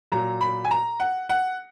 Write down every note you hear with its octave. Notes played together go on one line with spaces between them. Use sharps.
A#2 F#3 A#5
B5
G#5
A#5
F#5
F#5